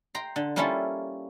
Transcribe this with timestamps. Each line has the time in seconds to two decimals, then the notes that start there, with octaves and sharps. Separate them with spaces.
0.15 G5 A#5 C6
0.36 D3
0.56 G3 A#3 C#4 E4 F4 A4